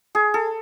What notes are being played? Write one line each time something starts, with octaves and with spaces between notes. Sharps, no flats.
G#4
A4